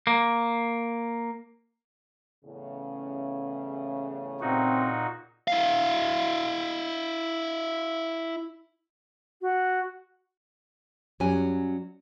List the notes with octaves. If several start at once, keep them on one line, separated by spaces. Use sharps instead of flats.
A#3
E2 A2 C#3
A#2 C4 D#4 F#4
E4 F5
F#4
F#2 F#3 G3 C#4 G#5